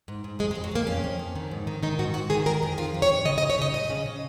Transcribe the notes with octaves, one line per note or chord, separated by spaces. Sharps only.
G#2
G#2
F2 G#3
G#3
F2
F#3
F2 A#3
F2 C#4
F2
F2
D#3
G#2
D#3
D#3 D#4
G#2 F#4
G#2 F#4
D#3 G#4
D#3 A#4
F2 G#4
D#3 F4
F2
C#5
F2
C#3 D#5
D#5
C#3
C#5
C#3 D#5
F2 D#5
C#3
C#3